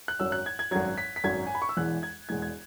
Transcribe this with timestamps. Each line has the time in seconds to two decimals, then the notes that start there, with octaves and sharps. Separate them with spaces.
0.08 F#6
0.19 G#1 F#2 F#3 E6
0.32 F#6
0.46 G#6
0.59 G#6
0.71 G#1 F#2 F#3 G#6
0.98 B6
1.16 B6
1.24 G#1 F#2 F#3 G#6
1.47 G#5
1.55 B5
1.62 C#6
1.69 E6
1.77 E1 E2 E3 G#3 F#6
2.03 G#6
2.29 E1 E2 E3 G#3 G#6
2.42 G#6